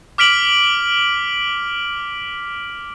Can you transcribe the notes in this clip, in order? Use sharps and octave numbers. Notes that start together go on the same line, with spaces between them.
D6 F6 B6 D7 F#7